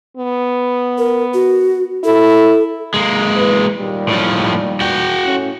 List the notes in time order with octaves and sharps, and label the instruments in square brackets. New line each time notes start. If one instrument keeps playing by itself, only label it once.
[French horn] B3
[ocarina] A#4
F#4
[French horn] E4 [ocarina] A4
[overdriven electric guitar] G#3 A#3
[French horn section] E2 B4
D#2 A#2 G3
[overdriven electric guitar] A2 F3
F#4 G5
[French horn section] A2 A3 C#4